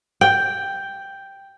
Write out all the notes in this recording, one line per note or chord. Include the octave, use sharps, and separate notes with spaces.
G5